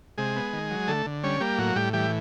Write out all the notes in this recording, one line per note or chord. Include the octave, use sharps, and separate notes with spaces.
C3 G#3 G#4
B3
D#3
F#3
D3 A3 A4
D3
G3 C#4 C#5
G3 A#3 G4
A2 F#3 F#4
A2 G3 G4
E3 G3 G4